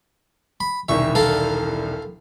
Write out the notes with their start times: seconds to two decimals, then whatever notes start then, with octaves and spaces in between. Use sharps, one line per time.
0.60 B5
0.89 E1 C2 D#3 E5 C#6
1.15 A4 A#4 F5